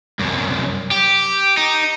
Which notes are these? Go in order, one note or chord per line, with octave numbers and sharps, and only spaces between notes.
C2 F#2
G4
D#4